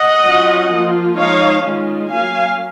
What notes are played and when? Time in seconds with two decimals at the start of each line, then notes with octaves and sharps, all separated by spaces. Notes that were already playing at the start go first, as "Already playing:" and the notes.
Already playing: D#5 F#5
0.24 F#3 C#4 F4
0.70 F3 A#3 F4
1.18 F3 G#3 D#4 C#5 F5
1.65 D#3 G#3 C#4 F4
2.12 F#3 A#3 C#4 F5 G#5